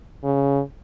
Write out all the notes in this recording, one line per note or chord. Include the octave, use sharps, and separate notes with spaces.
C#3